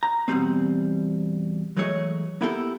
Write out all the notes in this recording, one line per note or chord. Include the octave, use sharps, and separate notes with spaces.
A#5
E2 B2 E3 G3 A3 C4
E3 F#3 G#3 A3 C#5 D#5
A#3 B3 E4 G4 A4 A#4